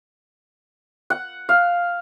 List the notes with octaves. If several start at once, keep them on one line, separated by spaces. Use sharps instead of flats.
F#5
F5